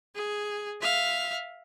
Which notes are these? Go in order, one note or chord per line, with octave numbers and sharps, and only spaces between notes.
G#4
E5 F5